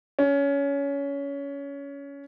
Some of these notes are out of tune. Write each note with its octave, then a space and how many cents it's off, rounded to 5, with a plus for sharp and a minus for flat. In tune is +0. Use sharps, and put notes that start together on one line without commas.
C#4 +20